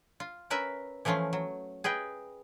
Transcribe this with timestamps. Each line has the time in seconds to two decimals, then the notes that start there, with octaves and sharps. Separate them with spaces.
0.20 F4
0.50 C#4 A#4 B4 E5
1.05 E3 F3 A3 C#4 F4
1.33 F#3
1.84 G#4 B4 D#5 G5